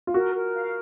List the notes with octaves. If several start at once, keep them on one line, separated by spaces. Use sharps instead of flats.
F4
F#4 A#4
A#4
F5